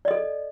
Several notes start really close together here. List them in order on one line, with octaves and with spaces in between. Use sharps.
D5 D#5 A4